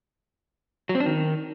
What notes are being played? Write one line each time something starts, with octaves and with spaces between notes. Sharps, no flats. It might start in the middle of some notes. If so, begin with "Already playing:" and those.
F#3
C4
D4
D#3